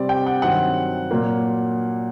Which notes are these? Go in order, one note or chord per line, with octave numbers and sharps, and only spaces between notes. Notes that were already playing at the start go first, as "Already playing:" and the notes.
Already playing: C3 G3 C4 D5
G5
F#5
G2 D#3 F#3 C4 F#5
A#2 F#3 A#3